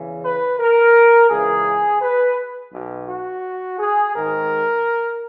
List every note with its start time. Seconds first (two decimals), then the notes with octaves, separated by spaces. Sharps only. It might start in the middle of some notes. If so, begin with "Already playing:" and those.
Already playing: E2 C#3 E3
0.24 B4
0.59 A#4
1.30 C#2 C#3 E3 G#4
2.01 B4
2.73 B1 B2
3.08 F#4
3.79 G#4
4.15 G#1 G#2 D#3 A#4